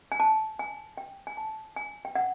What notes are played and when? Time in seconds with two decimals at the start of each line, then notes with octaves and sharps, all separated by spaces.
0.12 G#5
0.20 A5
0.59 G#5
0.98 G5
1.27 G#5
1.37 A5
1.76 G#5
2.05 G5
2.15 F#5